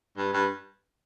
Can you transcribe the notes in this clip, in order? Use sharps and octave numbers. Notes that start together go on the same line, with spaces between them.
G2
G2